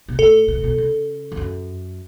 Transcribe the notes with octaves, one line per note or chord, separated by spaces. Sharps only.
B2
A2 A4
B2
A2
B2
C#3
E2
F#2